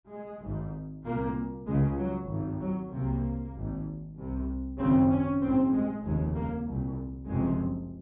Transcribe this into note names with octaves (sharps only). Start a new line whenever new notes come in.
G#3
G#1 G#2
C2 A#2 A#3
C#2 C#3 G#3
F#3
G#1 G#2
F#3
C2 C3 A#3
G#1 G#2
C2 C3
G#1 F#2 C#3 C4
C#4
A#1 C4
G#2
G#3
F1 D#2 C#3 G#3
A#3
C2 A#2
F#1 F2 C3 G#3